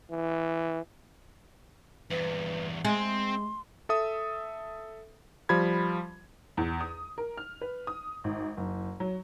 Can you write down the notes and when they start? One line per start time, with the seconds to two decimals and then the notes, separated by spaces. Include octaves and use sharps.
0.10 E3
2.10 E2 G2 B4
2.85 G#3 C4 C6
3.89 A4 E5 D#6
5.49 F3 G3 B5 G#6
6.57 E2
6.81 D#6
7.18 A#4
7.37 F6
7.61 B4
7.87 D#6
8.24 G#1
8.57 F#1
9.00 F#3